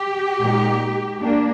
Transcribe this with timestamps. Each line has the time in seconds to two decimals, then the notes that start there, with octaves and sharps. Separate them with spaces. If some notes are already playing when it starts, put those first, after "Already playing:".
Already playing: G4
0.40 A#2 G#3 D#4
1.21 A#3 D4